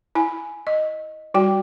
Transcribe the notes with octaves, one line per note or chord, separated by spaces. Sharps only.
E4 G#5
D#5
G3 F#4 G5